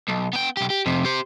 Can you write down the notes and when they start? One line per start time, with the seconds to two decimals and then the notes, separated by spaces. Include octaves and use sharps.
0.08 B1
0.33 B3 G5
0.57 B1 G4
0.70 G4
0.86 F2 C3
1.05 G4 C5